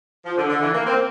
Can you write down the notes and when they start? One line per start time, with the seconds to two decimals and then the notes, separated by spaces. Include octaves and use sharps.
0.25 F3
0.37 D3
0.49 D3
0.62 E3
0.74 A#3
0.86 C4